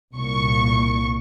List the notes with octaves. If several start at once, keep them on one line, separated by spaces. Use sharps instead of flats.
C2 A#2 C#6